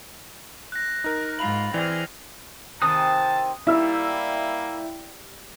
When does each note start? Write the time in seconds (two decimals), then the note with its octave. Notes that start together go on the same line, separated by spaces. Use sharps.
0.72 F#6 A#6
1.04 D#4 A#4
1.39 G#2 F4 B5 F7 F#7
1.74 E3 C4 G#4 D5 F6 F7
2.82 C3 D#3 G#5 A5 D#6 F#6
3.67 G3 A#3 E4 E6